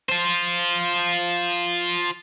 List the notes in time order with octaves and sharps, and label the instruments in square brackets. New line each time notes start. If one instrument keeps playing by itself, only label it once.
[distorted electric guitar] F4 C5